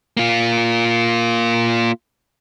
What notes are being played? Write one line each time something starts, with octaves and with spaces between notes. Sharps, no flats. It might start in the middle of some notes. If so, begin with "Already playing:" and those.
A#3 F4